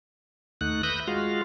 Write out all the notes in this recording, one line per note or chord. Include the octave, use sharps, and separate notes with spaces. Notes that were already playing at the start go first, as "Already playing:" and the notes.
D#2 A3 D#4 F#5 F#6
B4 E5 D#6 F#6 G6 A#6
G#3 F4 F#4 F5